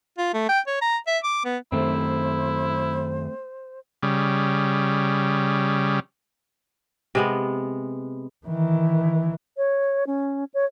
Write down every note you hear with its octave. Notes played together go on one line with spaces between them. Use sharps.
F4
A3
G5
C#5
A#5
E5
D6
B3
F#2 D#3 A3 C4 E4 C5
C#3 G3
C3 G#3 B3
D#3 E3
C#5
C#4
C#5